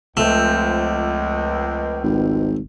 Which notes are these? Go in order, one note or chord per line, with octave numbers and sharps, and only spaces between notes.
C#2 F3 A3 C4
G#1